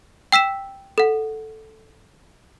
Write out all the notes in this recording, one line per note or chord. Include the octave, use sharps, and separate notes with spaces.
G5 E6 B6 E7
A4 F#5